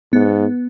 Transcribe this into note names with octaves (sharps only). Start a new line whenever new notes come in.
G#2 B3